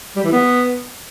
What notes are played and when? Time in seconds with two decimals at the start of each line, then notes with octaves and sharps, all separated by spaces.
0.16 G3
0.24 E3
0.32 B3